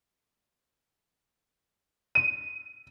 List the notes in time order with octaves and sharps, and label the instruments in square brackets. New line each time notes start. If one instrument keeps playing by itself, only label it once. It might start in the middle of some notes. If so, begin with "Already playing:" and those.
[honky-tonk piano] D#7